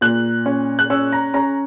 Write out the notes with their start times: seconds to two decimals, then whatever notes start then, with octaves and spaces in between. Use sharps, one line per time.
0.01 A#2 F#6
0.46 C#4
0.79 F#6
0.90 C#4 E6
1.12 A#5
1.34 C#4 A#5